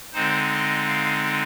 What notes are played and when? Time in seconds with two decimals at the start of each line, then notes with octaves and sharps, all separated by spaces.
0.13 D3 G#3 C4 D#4 C5
0.50 D#5
0.87 F5